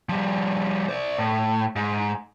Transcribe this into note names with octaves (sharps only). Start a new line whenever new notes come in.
F3 G3
C5 D5
A2
G#2